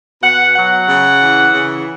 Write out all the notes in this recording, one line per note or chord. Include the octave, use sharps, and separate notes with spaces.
B2 F#5
F#3 F#5
C#3
E3
C#3